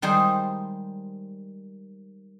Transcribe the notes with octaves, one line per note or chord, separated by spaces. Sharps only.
D#3 G3 G#3 G#4 C5